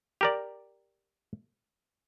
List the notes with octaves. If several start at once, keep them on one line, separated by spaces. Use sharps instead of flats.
G4 A#4 D5